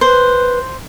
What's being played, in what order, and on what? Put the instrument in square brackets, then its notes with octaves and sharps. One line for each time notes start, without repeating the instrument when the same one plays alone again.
[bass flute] B4 [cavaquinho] C5